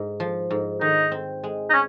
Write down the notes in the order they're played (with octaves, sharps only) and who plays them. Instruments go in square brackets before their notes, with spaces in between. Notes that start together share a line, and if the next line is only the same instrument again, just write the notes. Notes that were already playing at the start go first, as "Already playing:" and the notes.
Already playing: [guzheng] G#2 G#3
F3
G#2
[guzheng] D#3 [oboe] D#4
[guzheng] C4
G#3
[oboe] D#4
C#4